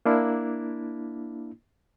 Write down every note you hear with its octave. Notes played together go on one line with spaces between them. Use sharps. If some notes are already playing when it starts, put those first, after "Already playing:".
A#3 D4 E4